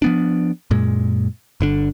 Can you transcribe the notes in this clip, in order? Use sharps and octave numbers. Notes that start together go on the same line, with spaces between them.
F3 B3 D4
F#2 A#2 G#3
G1 D3 D4